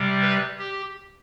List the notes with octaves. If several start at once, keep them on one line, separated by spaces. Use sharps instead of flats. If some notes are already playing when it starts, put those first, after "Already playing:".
Already playing: C3 G3
B4
G4